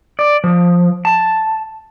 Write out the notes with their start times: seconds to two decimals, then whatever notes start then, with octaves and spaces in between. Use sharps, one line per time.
0.19 D5
0.44 F3
1.05 A5